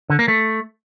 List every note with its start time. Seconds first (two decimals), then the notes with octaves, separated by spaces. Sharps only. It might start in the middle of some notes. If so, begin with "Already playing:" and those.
0.10 D3
0.19 A#3
0.28 A3